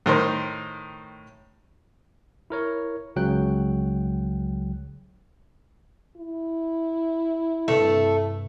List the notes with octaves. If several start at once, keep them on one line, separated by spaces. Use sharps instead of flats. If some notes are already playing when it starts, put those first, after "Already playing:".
A2 D#3 A#4 C5
E4 A#4 C#5
C#2 C#3 F#3 G5 F#6
E4
G2 C3 A3 A4